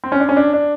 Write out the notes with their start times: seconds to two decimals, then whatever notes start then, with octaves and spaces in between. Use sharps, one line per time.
0.04 C4
0.12 C#4
0.20 D4
0.29 C#4
0.36 D4
0.53 D4